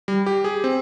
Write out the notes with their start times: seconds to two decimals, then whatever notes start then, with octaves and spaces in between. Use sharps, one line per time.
0.08 G3
0.26 G4
0.44 G#4
0.64 C4